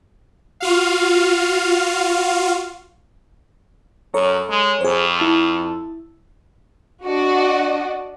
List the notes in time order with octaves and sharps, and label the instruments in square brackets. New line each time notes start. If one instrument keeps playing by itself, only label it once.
[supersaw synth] F4 F#4 F5
[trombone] F#2 [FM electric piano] A4 C#5 A#5
[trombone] G#3
[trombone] F2 [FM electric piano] G#4 C5
[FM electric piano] E4 A5 E6
[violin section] D4 F#4 D5 D#5 F#5